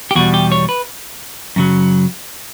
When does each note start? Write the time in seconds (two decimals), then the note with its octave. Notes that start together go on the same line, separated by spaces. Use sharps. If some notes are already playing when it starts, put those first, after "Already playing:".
0.11 G4
0.15 E2 B2 G3 F#4
0.34 G4
0.52 C#5
0.69 B4
1.56 F#2 C#3 F#3